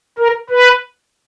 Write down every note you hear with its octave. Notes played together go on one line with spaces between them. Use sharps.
A#4
B4